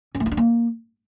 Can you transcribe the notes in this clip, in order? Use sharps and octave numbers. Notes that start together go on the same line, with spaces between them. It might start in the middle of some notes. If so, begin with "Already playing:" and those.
C#4
A3
D#4
D4
A#3